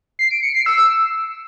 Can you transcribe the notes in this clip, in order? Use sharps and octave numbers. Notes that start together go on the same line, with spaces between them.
C7
D7
C#7
C7
E6